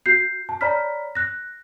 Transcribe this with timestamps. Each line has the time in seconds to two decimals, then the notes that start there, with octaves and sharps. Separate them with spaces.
0.06 F#4 G6 C7
0.49 A5
0.61 C#5 D5 A#5 B5 F6 B6
1.15 F#6 A#6